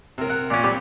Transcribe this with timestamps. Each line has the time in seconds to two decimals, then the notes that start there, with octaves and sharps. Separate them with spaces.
0.18 C3 A#4
0.30 F#5
0.50 A#2 C#4
0.64 G3 C4 G4